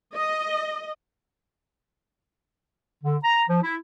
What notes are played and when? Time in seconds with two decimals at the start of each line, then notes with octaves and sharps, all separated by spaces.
0.15 D#5
3.04 D3
3.24 A#5
3.49 F3
3.63 E4